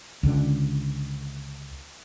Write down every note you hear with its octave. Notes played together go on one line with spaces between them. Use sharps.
C#2 D3